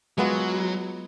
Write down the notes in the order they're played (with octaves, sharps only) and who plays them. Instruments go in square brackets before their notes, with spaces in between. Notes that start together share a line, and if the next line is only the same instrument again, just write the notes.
[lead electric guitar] F#3 [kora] G#3 B3 F4